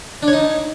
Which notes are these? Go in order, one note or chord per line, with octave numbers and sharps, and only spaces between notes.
D4
C#5
D#4